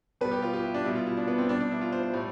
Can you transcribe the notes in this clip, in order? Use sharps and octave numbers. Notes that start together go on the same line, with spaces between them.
B2 G3 B4
G4
F4
G4
E4
D4
B2 G3 E4
F4
E4
D4
B3
C4
B2 G3 D4
D4
E4
F4
C5
C5
A2 G3